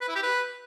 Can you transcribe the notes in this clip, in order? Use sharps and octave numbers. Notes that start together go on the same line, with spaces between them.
B4
E4
G4
B4